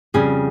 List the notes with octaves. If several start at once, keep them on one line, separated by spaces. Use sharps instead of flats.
F2 C#3 G3 G#4